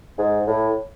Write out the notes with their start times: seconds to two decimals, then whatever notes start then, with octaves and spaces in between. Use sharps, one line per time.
0.18 G#2
0.47 A2